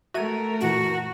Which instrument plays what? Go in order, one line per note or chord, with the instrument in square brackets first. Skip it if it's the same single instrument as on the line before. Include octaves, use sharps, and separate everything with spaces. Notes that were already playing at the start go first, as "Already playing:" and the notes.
[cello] A3 A#4 [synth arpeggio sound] F#4 E5 D#7
[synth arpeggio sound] F#2 A#2 E3 [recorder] F#4